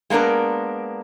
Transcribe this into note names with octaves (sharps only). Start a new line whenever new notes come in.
G#3 A#3 B3 D4 A#4